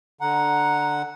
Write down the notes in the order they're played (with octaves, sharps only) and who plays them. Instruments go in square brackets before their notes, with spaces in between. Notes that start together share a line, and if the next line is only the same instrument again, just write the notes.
[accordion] D3 F#5 [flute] A#5